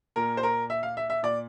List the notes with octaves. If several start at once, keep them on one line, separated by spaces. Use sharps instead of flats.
A#2 A#4
C5
A#4
E5
F5
E5
E5
A#2 D5